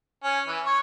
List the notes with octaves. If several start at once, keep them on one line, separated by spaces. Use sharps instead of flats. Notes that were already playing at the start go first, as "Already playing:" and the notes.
C#4
E3
C#5